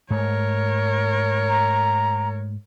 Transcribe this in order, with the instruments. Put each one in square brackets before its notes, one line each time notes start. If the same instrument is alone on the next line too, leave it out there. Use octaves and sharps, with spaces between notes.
[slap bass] G#2 A3 [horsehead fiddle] A#4 C#5
[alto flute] A#5